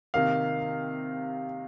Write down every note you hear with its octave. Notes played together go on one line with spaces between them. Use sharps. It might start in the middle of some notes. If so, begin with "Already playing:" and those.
C3 D#3 A#3 F5